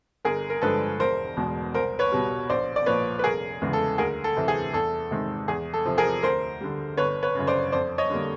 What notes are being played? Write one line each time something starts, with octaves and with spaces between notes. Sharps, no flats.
G1 G#4 A#4
A#4
G2 D3 F3 G#3 A4 B4
E1 A#4 C5
E2 B2 G#3
C2 A#4 C5
B4 C#5
B2 G3
A#1 C5 D5
D5
A#2 F3 B4 C#5
B4
F1 G#4 A#4
E2 C#3 E3 G#3
A4
D2 G#4 A#4
A4
C3 E3
G#4
E2 A4
C3 D#3 G#3
E2 G#4
A4
C3 F3
G#4 A#4
D2 A#4 C5
D3 G3
G1 B4 C#5
B4 C#5
F#2 C#3
C5 D5
F2 C5 D5
C#5 D#5
D3 G3 A#3